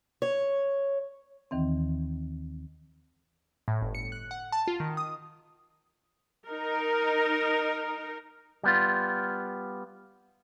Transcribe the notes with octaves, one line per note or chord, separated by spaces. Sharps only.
C#5
D#2 D#3 E3 C4
A2
G1
C#7
F#6
F#5
A5
F4
D#3
D#6
D#4 A#4
G3 B3 F4